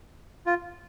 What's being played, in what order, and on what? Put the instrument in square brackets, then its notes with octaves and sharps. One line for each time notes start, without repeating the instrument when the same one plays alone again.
[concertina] F4